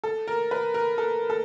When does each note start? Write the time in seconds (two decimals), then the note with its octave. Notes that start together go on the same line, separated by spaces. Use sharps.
0.04 A4
0.28 A#4
0.51 B4
0.74 A#4
0.98 A4
1.30 A4